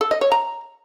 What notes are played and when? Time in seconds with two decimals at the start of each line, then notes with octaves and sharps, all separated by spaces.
0.01 A4
0.11 D#5
0.21 C#5
0.32 A#5